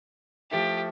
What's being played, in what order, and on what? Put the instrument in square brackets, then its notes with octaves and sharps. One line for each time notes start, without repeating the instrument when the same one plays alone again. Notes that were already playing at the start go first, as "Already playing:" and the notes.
[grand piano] F3 A3 E4 [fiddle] G4